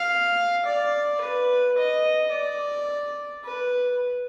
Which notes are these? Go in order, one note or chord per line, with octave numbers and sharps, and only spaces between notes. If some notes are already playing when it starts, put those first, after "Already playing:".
Already playing: F5
D5
B4
D#5
D5
B4